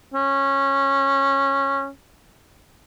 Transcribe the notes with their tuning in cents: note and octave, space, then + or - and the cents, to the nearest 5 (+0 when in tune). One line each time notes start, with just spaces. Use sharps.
C#4 -15